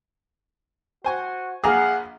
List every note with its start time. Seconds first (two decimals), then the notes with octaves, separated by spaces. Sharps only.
1.04 F#4 C5 G#5 C#6
1.64 A#1 G#4 F5 F#5 A#5 D6